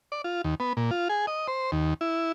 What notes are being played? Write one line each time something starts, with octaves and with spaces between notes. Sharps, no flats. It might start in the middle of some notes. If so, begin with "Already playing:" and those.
D5
F4
D#2
B3
A#2
F4
G#4
D#5
C5
D#2
E4